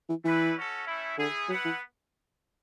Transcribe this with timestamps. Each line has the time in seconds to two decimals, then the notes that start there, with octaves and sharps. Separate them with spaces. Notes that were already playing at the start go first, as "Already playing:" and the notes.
0.09 E3
0.24 E3 A3 E4 B4 D5
0.55 C#4 F#4 A4
0.86 A3 C#4 E4
1.17 D3 A3 E4 G#4
1.49 F#3 B3 E4 B4 F#5
1.65 E3